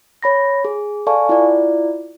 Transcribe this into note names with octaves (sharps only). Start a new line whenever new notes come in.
C#5 B5 A#6
G#4
A4 D5 F5 G#5 A5 C#6
E4 F4 D5